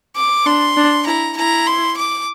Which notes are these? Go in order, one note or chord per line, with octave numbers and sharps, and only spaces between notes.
D6
D4 C6
D4
E4 A#5
E4 A#5
C6
D6